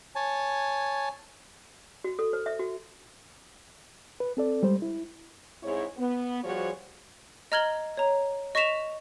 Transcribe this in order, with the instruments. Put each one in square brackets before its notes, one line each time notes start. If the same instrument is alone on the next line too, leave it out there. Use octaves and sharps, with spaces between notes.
[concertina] C#5 G#5 A5
[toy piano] F#4
A4
C5
E5
F#4
[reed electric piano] B4
C4 A4 D5
G3 G#3 C5
E4
[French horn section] G#2 C4 E4 G#4 C#5
B3
F3 G3 F#4 G#4 C5 C#5
[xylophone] D#5 A#5 F6 G#6 F#7 G7
C#5 A#5
D#5 C#6 A#6 B6 E7 F7